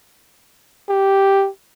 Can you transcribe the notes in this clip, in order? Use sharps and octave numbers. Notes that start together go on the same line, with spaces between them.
G4